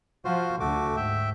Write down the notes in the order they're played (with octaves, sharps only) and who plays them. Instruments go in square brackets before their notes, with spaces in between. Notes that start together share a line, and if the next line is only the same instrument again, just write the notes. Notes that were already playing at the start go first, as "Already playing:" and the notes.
[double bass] F3 [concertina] F4 F#4 C5
[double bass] D2 D3 [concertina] A3 F#4 D6
[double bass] G#2 [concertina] E5 G5